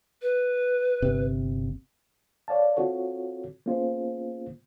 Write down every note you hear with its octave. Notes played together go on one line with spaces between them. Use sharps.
B4
G1 C3 C4
C#5 D5 F5 A5
C4 F4 F#4 A4 C#5
A#3 B3 C#4 F4 G#4 C5